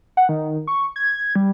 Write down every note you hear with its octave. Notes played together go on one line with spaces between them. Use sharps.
F#5
D#3
C#6
G#6
G3